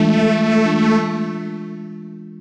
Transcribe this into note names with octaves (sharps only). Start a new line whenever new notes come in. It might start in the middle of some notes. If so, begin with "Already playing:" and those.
Already playing: E3 G#3 A3 D4 F4
E3 G#3 D4 F4